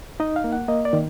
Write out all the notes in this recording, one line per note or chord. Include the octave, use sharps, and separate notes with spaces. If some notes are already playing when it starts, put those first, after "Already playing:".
D#4 D#5
F5
A#3
F#5
A#3 D#5
D5
D#3